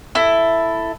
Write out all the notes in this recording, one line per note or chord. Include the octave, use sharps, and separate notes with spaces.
E4 A4